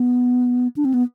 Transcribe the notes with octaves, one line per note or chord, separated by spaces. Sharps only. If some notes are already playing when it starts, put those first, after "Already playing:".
Already playing: B3
D4
C4
B3